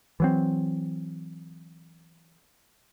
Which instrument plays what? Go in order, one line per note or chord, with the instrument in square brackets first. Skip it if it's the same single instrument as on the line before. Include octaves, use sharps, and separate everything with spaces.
[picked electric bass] E3 F#3 C4